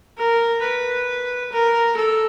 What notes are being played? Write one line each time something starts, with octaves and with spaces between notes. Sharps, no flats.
A#4
B4
A#4
A4